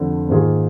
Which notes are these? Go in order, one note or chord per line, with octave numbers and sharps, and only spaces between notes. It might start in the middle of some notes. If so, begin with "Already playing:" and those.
Already playing: F1 F2 D3
G#2 D#3 A#3 F4 G#4